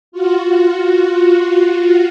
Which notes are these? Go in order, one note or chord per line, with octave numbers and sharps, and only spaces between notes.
F4 F#4